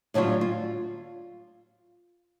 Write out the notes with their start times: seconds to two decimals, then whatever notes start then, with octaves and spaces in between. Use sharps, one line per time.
0.14 A2 D3 F#3 G3 F4
0.41 F4